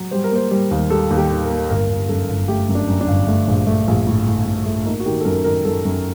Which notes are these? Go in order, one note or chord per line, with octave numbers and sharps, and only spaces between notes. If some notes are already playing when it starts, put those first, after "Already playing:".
Already playing: F#3
G3 C5
A#4
A#3 C5
G3
D#2
G3 A4
D#2
G4
D#3
A#4
A#3
G1 A#4
G1
F#2 A4
G1
A3 G4
F#2
D4
F#2
D4
G1
A3
A#1
A3
A#1
A2
A2
A2
A3
A#3 D#4
F#4
D#3 G4
A4
F#2 A#4
D#3 A#4
F#2 A4
F#2